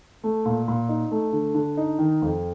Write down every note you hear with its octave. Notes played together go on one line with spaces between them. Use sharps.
A3
A#2
A#2
D#4
A3
D3
D3
D#4
D#3
F2